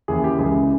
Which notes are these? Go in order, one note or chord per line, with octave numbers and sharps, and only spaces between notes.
D#2 C#3 E3 G#4
G4
C#2 C#3 E3 G#4